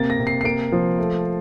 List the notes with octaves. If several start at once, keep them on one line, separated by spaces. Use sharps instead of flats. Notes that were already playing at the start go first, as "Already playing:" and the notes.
Already playing: C3 A#3 A6
A#6
C3
C7
C7
A#3 D7
F3
A3